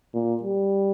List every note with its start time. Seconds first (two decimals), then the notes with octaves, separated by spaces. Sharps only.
0.14 A#2
0.43 G3